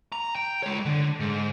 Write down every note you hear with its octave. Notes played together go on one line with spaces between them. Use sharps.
A#5
G5
G#3 C#5
D3
G#2